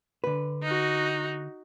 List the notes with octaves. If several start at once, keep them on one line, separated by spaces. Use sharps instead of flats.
D3 B4
D#4 F#4